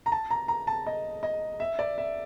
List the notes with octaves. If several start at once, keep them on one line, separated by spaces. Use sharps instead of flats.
A#5
A5
A#5
A#5
A5
D#5
D#5
E5
D5
E5